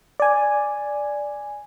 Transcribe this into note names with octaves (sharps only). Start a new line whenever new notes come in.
D5 G#5